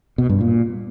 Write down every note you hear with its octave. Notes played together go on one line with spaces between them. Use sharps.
B2
G2
A#2